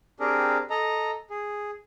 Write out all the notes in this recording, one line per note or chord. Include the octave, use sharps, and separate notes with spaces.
C4 D4 G4 G#4 A#4
A4 D#5 A#5
G#4